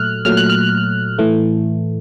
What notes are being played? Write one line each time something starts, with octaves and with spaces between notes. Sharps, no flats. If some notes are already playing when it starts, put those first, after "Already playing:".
Already playing: A#2 F#3 A3 F6 F#6
A#2 F#3 A3 F6
F#6
F6
A2 E3 A3